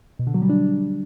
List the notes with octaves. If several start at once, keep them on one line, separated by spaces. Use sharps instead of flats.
B2
D3
F#3
G3
D4